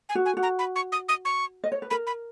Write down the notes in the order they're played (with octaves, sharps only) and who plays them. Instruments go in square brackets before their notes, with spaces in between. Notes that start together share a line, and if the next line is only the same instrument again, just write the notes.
[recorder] G#5
[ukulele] F#4
[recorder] G#5
[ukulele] F#4
[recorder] A#5
B5
C#6
D#6
D#6
C#6
[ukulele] D#5
C#5
B4
[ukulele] A#4 [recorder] B5
[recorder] B5